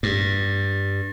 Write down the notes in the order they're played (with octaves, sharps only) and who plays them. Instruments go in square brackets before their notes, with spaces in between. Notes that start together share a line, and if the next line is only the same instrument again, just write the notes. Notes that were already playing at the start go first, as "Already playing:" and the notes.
[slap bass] G2